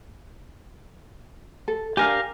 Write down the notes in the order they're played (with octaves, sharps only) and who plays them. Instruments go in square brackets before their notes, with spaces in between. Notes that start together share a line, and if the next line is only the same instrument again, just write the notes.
[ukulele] A4
[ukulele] D4 G#5 [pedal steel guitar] G4 A#4 F5